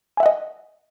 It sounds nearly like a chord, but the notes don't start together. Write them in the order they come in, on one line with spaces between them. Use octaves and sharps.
G#5 E5 F#5 D#5